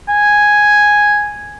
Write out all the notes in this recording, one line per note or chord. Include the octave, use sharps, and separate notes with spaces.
G#5